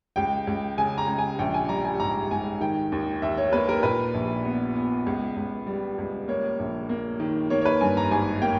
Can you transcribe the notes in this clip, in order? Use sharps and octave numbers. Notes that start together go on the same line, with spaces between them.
C#2 G5
C#2
C#3 G#5
A#5
C#2
G#5
A#1 G5
G#5
G3 A#5
G#5
G#2 A#5
G#2 G#5
D#3 G5
D#2
D#2 E5
C#5
A#3 B4
A#4
A#2 B4
A#1
B3
B3
C#2
C#2
G3
C#2
A#3 C#5
A#1
A#3
D#3
A#3 C#5
C#5
B4
G2 G#5
A#5
G#1 G#5
A#3 G5